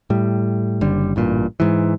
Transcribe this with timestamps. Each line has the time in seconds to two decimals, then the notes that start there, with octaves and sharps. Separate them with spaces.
0.10 A2 G3
0.81 F#1 D3 G3
1.16 A1 G2 A#2
1.60 G#2 E3